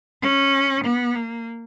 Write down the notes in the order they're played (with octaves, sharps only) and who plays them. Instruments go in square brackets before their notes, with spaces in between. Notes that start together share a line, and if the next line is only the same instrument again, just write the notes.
[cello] C#4
B3
A#3